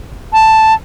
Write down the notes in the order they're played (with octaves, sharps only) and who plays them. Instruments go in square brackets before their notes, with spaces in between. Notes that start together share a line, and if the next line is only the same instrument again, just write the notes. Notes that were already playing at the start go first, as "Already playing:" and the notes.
[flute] A5